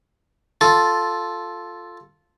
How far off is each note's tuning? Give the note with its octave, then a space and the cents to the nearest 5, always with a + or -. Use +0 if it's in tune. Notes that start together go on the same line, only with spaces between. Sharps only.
F4 +0 A4 +0